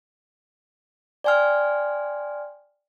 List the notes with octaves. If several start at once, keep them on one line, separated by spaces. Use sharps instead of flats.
D5 G5 G#5 C6 F6